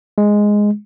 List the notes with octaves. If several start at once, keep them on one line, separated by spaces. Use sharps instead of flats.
G#3